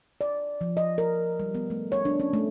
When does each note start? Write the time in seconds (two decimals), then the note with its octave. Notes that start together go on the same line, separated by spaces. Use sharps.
0.21 D5
0.61 F3
0.77 D#5
0.98 A#4
1.40 G3
1.55 B3
1.70 A3
1.92 C#5
2.05 D4
2.20 C#4
2.33 A3